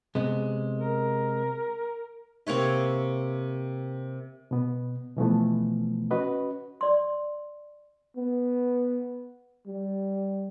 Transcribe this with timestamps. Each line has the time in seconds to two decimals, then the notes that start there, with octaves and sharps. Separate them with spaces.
0.15 C3 G#3 B3
0.78 A#4
2.47 C3 A#3 C#5 E5
4.51 B2 B3
5.17 B2 E3 F3 A3 B3
6.11 C#4 F#4 B4 D#5
6.81 D5 C6
8.17 B3
9.67 G3